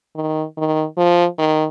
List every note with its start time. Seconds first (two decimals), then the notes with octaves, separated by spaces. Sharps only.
0.16 D#3
0.57 D#3
0.97 F3
1.38 D#3